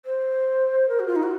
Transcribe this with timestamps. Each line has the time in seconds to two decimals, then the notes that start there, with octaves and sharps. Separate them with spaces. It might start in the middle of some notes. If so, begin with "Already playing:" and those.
0.05 C5
0.88 A#4
0.99 F#4
1.07 F4
1.16 D#4
1.23 F#4